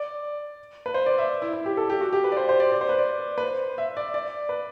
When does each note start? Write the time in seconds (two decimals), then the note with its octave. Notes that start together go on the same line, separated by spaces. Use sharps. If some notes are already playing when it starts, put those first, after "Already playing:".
Already playing: D5
0.86 B4
0.94 C5
1.06 D5
1.18 E5
1.42 E4
1.53 E4
1.66 G4
1.77 A4
1.90 G4
2.01 F#4
2.13 G4
2.24 B4
2.32 D5
2.37 C5
2.49 C5
2.60 D5
2.72 D5
2.81 C5
2.89 B4
2.99 D5
3.38 B4
3.43 C5
3.78 E5
3.97 D5
4.14 D5
4.49 B4